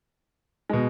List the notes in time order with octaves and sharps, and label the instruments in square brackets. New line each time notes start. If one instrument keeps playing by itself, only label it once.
[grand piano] B2 G#3